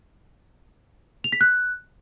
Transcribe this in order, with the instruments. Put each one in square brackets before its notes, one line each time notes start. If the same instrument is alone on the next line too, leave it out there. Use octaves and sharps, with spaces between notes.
[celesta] F7
B6
F#6